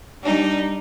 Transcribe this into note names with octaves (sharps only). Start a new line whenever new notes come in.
G3 D4 D#4